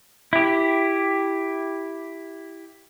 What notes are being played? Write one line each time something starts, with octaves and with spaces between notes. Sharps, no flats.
E4 G4